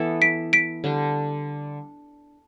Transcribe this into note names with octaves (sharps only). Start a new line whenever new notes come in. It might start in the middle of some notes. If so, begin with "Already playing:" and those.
Already playing: E3 B3 E4 A4
B6 D7
B6 D7
D3 G3 D4